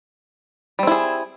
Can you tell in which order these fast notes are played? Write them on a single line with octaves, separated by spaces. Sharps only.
G3 C4 E4 G#4